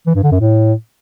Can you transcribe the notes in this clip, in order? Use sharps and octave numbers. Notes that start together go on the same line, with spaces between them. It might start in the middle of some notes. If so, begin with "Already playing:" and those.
E3
G2
D3
F#2
A2